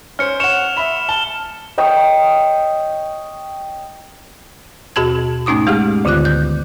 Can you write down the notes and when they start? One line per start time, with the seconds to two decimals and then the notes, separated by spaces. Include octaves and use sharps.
0.19 C#4 C5 F6 C#7
0.40 C#5 F#5 C#7 E7 F7
0.77 E5 B5
1.09 A5 G7
1.78 C#5 D#5 G5 E6
4.96 D#2 B2 F#4 G#4 A5 G#6
5.46 G#2 A3 C#4 D#4 D6 D#6
5.67 G#3 G4 G#4 F5 F#5 F6
6.05 D2 D3 D#3 F4 D6 F#6
6.25 G6